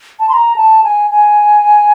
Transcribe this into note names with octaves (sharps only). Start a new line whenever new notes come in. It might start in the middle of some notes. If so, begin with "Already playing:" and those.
A5
C6
A#5
A5
G#5
G#5